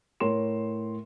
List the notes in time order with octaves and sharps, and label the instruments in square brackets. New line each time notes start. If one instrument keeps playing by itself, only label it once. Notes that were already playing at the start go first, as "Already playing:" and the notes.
[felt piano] A2 A#4 C#5 C6 E7